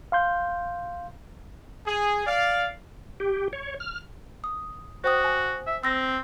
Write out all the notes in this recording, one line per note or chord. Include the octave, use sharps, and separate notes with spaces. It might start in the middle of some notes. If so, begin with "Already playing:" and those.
F5 C6 G6
G#4
D5 F5
G4
C#5
F6
D#6
F#4 C5 G5 D#6
G#5
E5
C4 E6 A#6